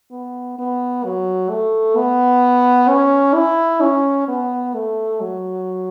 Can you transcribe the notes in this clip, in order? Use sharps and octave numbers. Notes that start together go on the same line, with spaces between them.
B3
B3
F#3
A3
B3
C#4
E4
C#4
B3
A3
F#3